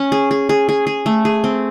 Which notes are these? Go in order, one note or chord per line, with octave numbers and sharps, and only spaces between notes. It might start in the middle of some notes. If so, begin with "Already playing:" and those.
Already playing: C#4
G#4
G#4
G#4
G#4
G#4
A3
G#4
C4